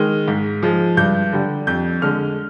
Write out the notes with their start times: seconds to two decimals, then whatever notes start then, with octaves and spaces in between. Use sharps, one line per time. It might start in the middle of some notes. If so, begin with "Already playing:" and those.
Already playing: D#3 G#3 F6
0.28 G#2
0.62 F3 G#3
0.97 G2 G6
1.33 D3 G3
1.67 F2 G6
2.02 D3 G#3 F6